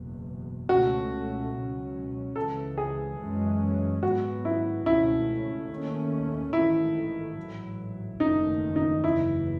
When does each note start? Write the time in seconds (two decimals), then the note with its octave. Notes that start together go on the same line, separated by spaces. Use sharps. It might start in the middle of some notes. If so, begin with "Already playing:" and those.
Already playing: F#1 E2 B2
0.69 C#2 B2 A3 C#4 F#4
1.53 C#2 B2 F#3 C#4
2.36 C#2 C#3 E3 A4
2.78 G#4
3.19 F#2 E3 G#3 C#4
4.03 G#2 F#3 B3 F#4
4.45 E4
4.86 C#2 B2 A3 C#4 E4
5.70 D#2 D#3 A3 C#4
6.53 A1 G#2 D#3 A3 E4
7.37 A1 G#2 F#3
8.20 F#1 E2 D#3 A3 D#4
8.76 D#4
9.03 F#1 E2 C#3 E3 E4